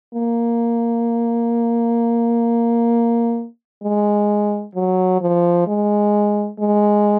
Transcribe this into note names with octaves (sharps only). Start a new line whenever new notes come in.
A#3
G#3
F#3
F3
G#3
G#3